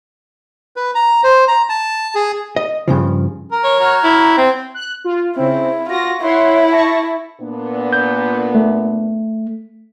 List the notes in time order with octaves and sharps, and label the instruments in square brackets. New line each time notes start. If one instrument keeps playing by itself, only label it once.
[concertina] B4
A#5
C5
A#5
A5
G#4
[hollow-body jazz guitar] D#5
G2 C#3 F3
[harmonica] A#4
[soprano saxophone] C#5
[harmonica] F#3 A#5 F6
[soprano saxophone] E4
C4
[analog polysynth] F#6
F4
[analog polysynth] C#3 C4 [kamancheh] E4
[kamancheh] F4 F#4 [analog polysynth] A#6
[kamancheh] E4 [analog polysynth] C#5 F#5 C6
[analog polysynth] A5 C#6 A#6
[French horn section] A#2 B3 D4
[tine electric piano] G6
A3